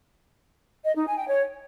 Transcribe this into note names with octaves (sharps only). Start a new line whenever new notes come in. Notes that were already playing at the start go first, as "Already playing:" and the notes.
D#5
D#4
G#5
G5
C#5